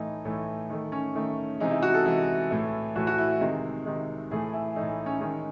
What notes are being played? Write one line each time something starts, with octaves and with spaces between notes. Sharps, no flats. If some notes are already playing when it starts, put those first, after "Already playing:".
Already playing: A2 E3 A3 D#4
A2 E3 A3
D#3 A3
C#4
D#3 A3
C3 E3 G#3 D#4
E4
F#4
A4
C3 E3 G#3
A2 E3 A3
A2 E3 A3 F#4
F#4
E4
C3 D#3 G#3
C3 D#3 G#3
A2 E3 A3 G#4
E4
A2 E3 A3 D#4
C#4
D#3 G#3 C#4